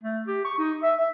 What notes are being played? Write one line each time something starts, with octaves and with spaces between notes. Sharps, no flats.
A3
G4
C#6
D#4
E5
E5